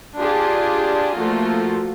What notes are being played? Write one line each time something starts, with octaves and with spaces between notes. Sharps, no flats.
D4 F4 G4 G#4
F3 A3 A#3 F4 F#4